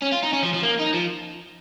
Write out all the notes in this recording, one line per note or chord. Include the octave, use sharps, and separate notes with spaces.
C#4
F4
D#4
C#4
F3
F3
A#3
D#4
F3